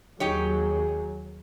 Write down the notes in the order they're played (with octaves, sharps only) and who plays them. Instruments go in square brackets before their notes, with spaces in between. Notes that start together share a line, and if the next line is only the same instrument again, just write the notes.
[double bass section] D#2 F#3 [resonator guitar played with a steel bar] D#4 G4 C#5 [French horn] G#4